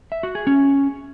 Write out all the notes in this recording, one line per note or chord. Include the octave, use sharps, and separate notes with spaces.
E5
F#4
G#4
C#4